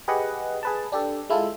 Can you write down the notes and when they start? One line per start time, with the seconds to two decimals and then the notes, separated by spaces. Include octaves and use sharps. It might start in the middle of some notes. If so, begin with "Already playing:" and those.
0.08 G4 G#4 B4 D#5 F#5
0.63 G#4 B4 A5
0.92 D4 G4 A4
1.30 G#3 E4 F4 A4